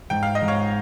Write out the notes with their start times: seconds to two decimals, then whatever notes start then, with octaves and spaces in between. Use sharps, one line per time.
0.10 G#2 G5
0.23 F5
0.35 D#5
0.42 G#2
0.48 C#5 F5